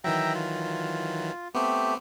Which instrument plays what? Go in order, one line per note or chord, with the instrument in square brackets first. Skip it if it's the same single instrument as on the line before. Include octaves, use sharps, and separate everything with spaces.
[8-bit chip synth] D#3 E3 F#3 [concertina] E5 G5 A#5
[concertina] F4
[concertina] A3 G4 [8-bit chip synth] B3 C4